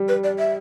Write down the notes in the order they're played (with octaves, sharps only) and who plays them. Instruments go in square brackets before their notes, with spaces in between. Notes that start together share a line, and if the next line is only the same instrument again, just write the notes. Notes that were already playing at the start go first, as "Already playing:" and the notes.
Already playing: [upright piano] G3
[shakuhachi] B4
D5
E5